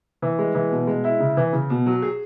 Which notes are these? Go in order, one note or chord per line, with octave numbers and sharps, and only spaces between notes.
E3
G#3
E3
B2
G#3
E4
C#3
E3
C#3
B2
F#3
G#4